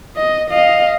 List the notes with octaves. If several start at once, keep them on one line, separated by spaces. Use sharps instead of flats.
D#5
D#5 F5